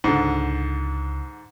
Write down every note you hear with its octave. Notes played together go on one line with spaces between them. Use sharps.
C#2 G#2 D3